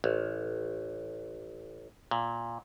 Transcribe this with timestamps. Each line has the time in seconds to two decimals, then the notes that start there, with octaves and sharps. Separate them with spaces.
0.04 A1
2.11 A#2